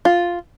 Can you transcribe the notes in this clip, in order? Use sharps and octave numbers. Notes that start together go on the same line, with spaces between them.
F4